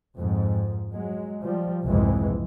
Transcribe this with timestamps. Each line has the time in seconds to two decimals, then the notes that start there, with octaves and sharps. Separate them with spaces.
0.16 F2 G#2
0.92 F#3 G#3
1.42 F3 G3
1.84 F#1 C2 F2 G#2 E3 G#3